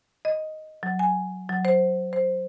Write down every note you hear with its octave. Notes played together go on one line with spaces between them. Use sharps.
D#5
F#3
G#5
F#3
C5
C5